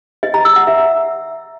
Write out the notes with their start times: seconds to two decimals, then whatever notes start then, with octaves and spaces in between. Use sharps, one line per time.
0.23 D#5
0.34 A#5
0.45 E6
0.56 F#5
0.67 E5